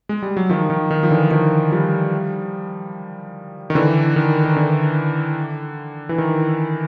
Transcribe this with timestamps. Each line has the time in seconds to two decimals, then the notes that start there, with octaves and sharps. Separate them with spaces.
0.09 G#3
0.23 G3
0.37 F#3
0.49 D#3 F3
0.70 D#3
0.91 D#3
1.03 F3
1.10 D3 E3
1.31 D#3 F3
1.72 F3 G3
3.70 D#3
3.75 D3 E3
4.16 D#3
4.45 D#3
4.56 D3
6.09 E3
6.18 D#3